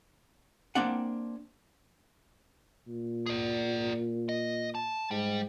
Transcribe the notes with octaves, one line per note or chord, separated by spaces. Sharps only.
A#3 C4 D4 F#5
A#2
G#4 D5
D#5
A5
G#2 G3